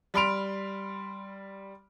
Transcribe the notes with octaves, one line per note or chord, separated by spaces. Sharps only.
G3 B5 C6 F6 D7 F7